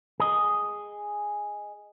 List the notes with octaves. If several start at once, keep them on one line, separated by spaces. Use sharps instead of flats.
G#4 D#5